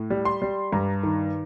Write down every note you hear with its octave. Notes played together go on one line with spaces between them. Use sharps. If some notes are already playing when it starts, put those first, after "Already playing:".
Already playing: A2
G3
C6
G3
G2 A#5
D#3